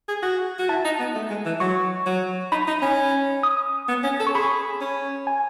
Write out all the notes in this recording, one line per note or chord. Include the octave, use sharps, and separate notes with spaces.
G#4
F#4
F#4
E4 A5
D#4
B3
A3
G#3
E3
F#3 C#6
F#3
D#4 B5
D#4
C#4
D#6
B3
C#4
A4
C#6
G#4 B5
C#4
G#5